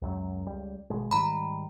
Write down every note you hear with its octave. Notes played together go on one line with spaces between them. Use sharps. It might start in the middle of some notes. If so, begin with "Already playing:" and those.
C#2 F#2 F#3
C#2 G3
G#1 B2 G#3
G#2 D#3 G3 A#5 B5